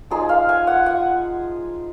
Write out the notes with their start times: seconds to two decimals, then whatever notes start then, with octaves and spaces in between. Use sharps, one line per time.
0.11 F3 G#3 D#4 G#4
0.29 F5
0.49 G#5
0.67 F#5
0.86 F#5